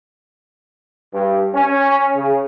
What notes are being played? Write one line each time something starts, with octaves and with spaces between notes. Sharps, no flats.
G2
C#4
C#3